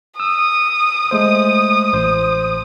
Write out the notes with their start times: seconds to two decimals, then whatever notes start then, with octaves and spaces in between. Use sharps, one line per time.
0.20 D#6 E6
1.11 G#3 A3 C5
1.93 A1 C5